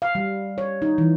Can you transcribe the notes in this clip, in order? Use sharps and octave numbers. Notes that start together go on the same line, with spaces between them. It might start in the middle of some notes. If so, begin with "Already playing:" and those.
F5
G3
C#5
D#4
E3